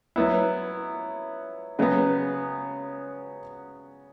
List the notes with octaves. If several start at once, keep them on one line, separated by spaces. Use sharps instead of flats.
F#3 B3 E4
C#3 F#3 B3